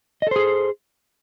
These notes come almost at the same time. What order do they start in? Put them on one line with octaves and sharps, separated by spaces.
D#5 A4 C5 G#4